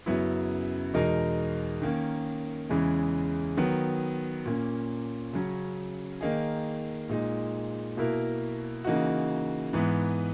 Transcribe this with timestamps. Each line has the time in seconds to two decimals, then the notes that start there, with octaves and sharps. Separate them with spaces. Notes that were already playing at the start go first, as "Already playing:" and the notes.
0.06 F#2 C#3 F#3 B3 E4
0.94 E2 B2 G#3 D#4 A#4
1.82 D#3 A#3 C#4
2.69 E2 C#3 E3 G#3 C#4
3.57 D#3 F#3 B3
4.45 A#2 A#3 C#4
5.33 C#3 F#3 C#4
6.21 D#3 A#3 D#4 G#4
7.09 A#2 G#3 D#4
7.97 B2 A#3 E4 A#4
8.85 C#3 E3 A#3 D#4 F#4
9.73 G#2 E3 B3